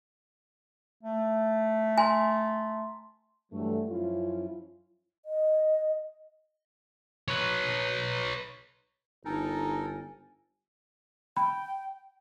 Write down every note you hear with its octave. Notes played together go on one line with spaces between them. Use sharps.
A3
G#5 A#5 C6
G2 E3 F#3 G3 A3
F#2 F3 C#4 E4 F4
D#5
B4 C#5
G1 D#4 A4 A#4 G#5
G5 B5